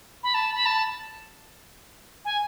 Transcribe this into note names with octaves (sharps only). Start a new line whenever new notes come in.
B5
A5
B5
A5
G#5